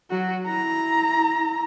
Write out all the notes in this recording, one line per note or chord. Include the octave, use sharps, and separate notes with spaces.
F#3 F#4
E4 A#5